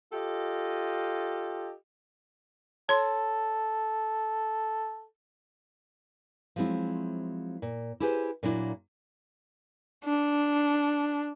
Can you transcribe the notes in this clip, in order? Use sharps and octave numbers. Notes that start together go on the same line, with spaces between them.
F4 G4 A4 D#5
A4 C#5 C6
F3 F#3 G#3 C4 E4
A#2
E4 G4 G#4 B4 C5
A#2 F#3 A#3 D4 E4
D4